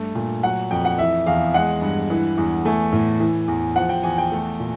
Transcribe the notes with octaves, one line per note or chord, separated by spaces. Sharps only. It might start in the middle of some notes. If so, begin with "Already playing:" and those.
Already playing: G2 A3
A#2
F#3 F#5
F2 G5
F#5
E3 E5
E2 F5
G#3 F#5
G2
E3
E2
A3 G#5
A2
E3
E2
F3 F#5
G5
E2 G#5
G5
A3
A#2